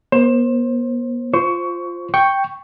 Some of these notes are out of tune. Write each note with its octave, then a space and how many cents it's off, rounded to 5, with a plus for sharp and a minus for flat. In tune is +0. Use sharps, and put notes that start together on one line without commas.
B3 -45 C5 +25
F4 +0 C5 +0 C#6 +20
G5 +0 C#6 +0